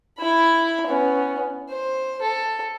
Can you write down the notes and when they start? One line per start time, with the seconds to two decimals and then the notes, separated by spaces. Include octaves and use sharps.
0.19 E4 B5
0.87 B3 C#4
1.69 C5
2.22 A4